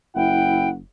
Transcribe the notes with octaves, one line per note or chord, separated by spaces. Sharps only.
F#1 E4 F#5 G5